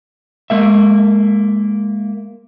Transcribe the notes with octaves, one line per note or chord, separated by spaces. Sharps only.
G#3 A#3 E5